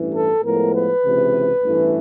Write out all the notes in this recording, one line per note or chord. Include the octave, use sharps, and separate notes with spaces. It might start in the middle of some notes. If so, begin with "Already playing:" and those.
Already playing: A1 G2 E3
A4
A2 F3 G#3 B3 A#4
B4
C#2 C3 E3
A1 G2 E3 A3